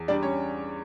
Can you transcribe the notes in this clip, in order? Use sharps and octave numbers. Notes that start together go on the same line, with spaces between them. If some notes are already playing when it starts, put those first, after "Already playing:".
Already playing: E2
G3 D4 D5
C#4 C#5